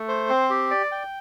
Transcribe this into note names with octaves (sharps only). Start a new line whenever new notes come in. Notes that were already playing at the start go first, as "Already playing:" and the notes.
Already playing: A3
C5
C4
G4
D5
G5